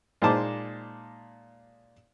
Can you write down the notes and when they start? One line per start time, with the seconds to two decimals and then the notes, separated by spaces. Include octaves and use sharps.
0.22 A#2 G#3 D#4 C5 A5 D6